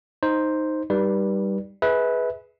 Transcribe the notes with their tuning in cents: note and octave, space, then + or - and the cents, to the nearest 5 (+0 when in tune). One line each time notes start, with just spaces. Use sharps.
D#4 +0 C5 +0
G3 +0 D#4 -10 B4 -25
G#4 +10 B4 +0 E5 -35